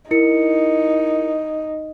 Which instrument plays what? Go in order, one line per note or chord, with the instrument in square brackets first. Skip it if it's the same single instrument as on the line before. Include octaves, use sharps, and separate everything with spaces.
[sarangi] D#4 [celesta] E4 A#4 C#7